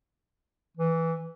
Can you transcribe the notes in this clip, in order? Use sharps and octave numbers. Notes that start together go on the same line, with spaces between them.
E3